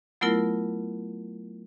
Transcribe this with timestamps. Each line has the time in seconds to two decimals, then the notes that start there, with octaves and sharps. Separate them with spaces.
0.21 F#3 A3 B3 E4 F4 A#4